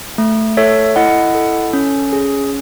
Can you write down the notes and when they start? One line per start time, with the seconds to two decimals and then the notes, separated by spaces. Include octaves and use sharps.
0.18 A3
0.57 A4 C#5 E5
0.96 E4 D#5 F#5
1.35 A4
1.73 C#4
2.13 G#4